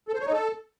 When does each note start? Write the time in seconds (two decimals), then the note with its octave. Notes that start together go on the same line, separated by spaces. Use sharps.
0.08 A4
0.14 C5
0.20 C#5
0.26 D#4
0.32 A4